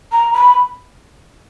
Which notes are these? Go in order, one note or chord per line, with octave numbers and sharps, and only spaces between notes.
A#5
B5